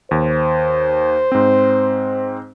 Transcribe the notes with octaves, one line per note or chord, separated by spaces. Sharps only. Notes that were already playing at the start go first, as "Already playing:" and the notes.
D#2 C5
G#2 C4